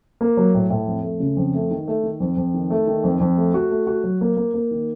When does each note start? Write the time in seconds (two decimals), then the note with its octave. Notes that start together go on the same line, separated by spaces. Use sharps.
0.21 A#3
0.37 F#3
0.54 A2
0.70 A2
0.87 F2
1.03 A3
1.20 C#3
1.37 F2
1.54 A3
1.71 D#3
1.88 A3
2.03 D#3
2.20 F2
2.37 F2
2.54 D#3
2.70 A3
2.87 D#3
3.03 F2
3.20 F2
3.37 A3
3.54 F#4
3.71 A3
3.87 F#4
4.04 F#3
4.21 A#3
4.37 A#3
4.54 A#3
4.71 D#3